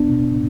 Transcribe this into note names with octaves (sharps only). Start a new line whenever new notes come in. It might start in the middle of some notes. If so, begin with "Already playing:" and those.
Already playing: B3 D4
B2